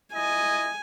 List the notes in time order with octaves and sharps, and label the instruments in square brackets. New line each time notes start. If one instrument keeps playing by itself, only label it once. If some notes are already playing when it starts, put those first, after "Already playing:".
[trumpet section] E4 D#5 [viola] G#5